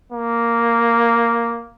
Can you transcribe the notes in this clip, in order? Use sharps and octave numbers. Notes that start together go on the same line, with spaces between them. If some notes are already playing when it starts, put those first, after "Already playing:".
A#3